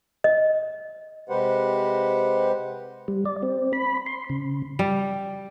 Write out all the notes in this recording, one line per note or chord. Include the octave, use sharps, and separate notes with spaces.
D#5
C3 G#3 G4 B4 C5 F#5
G3
D5
C4
B5
C6
C#3
G3